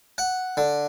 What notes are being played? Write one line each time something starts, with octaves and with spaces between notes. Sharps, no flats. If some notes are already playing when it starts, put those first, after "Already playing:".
F#5
D3